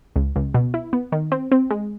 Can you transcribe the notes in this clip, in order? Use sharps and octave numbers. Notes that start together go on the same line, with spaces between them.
C#2
C#2
B2
E4
B3
D#3
C4
C4
G#3